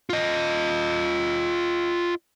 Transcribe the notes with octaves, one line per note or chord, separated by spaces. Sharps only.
F4 D#5